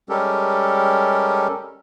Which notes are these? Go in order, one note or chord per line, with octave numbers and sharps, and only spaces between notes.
G3 G#3 C#4 G4 A4 A#4